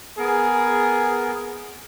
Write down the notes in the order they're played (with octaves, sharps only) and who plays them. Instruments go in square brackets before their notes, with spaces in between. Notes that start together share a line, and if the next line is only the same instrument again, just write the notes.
[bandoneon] B3 A#4 [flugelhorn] G#4